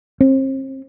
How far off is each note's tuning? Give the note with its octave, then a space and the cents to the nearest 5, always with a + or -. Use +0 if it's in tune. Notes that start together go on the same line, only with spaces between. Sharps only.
C4 +35